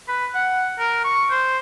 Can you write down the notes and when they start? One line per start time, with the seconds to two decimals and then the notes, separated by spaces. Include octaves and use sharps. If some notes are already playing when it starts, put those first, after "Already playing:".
0.08 B4
0.35 F#5
0.79 A#4
1.04 C#6
1.31 C5